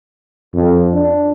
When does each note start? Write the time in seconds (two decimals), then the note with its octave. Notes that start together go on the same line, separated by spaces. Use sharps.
0.55 F2
0.94 D4